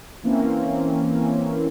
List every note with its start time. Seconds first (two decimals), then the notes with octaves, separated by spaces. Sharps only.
0.23 E3 A#3 C4 C#4